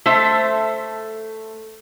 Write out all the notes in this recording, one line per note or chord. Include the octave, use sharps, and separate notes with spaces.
A3 A4 C5 E5